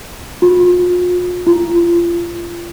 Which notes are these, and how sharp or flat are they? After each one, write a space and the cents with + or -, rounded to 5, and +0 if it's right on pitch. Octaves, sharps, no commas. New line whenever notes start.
F4 +40
F4 -30